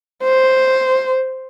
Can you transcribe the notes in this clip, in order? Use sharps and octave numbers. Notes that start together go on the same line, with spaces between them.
C5